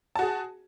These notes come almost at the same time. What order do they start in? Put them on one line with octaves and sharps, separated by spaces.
A5 F#4 G#4